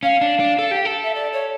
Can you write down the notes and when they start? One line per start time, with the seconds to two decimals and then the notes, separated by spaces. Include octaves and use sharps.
0.03 C#4 F5
0.21 D4
0.39 D4
0.59 A4
0.71 G4
0.85 A4
1.03 E5
1.15 D5
1.32 C#5